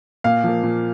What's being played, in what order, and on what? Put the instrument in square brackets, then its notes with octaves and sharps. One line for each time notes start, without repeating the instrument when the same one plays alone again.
[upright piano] A#2 F5
F3 A#3
A#2